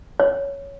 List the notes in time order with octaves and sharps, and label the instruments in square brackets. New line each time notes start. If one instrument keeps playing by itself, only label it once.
[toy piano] C#5